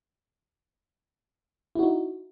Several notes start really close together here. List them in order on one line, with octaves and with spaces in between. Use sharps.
E4 F#4 D#4